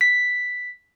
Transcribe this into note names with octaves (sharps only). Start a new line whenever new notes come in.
B6